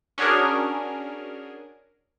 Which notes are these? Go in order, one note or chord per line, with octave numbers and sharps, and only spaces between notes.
C#4 D4 F#4 G#4 A#4